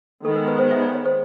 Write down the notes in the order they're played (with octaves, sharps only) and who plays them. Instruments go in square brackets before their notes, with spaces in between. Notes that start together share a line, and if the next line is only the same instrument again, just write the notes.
[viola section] D#3 G#3 B3 [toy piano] A4
[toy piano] A#4
B4
C5
E5
D5
C#5
C5